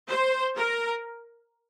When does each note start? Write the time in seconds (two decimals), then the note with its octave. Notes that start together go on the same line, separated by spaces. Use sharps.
0.09 C5
0.56 A#4